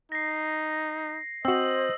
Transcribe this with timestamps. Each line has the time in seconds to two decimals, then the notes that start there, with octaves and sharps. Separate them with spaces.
0.12 D#4 A#6 C7
1.45 C4 F#4 C5 D#5 E6 F#7